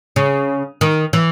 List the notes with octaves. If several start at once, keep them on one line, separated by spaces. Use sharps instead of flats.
C#3
D#3
E3